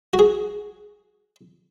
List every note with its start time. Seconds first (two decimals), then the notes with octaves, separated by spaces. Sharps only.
0.14 F#4
0.19 G#4